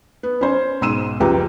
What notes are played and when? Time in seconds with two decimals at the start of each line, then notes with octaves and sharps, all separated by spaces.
0.23 B3
0.41 C#4 C5
0.81 B1 G#2 C6 E6 D#7 E7
1.20 F#1 C#2 F3 G4 B4 A#5